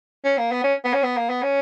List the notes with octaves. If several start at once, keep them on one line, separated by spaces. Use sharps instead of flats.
C#4
A#3
B3
C#4
B3
C#4
B3
A#3
B3
C#4